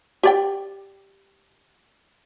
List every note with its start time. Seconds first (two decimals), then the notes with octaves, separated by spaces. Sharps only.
0.23 G4 D5 G5